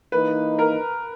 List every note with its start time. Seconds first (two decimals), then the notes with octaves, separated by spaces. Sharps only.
0.12 E3 A#3 D#4 B4
0.59 A#4